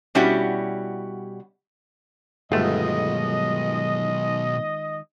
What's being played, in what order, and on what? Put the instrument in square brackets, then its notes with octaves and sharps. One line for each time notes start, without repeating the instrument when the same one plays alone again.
[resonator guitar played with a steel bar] B2 G3 C#4 E4 F#4 G4
[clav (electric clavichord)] G1 A3 [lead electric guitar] B2 F#3 [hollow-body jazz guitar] D#3 G#3 F4 [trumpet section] D#5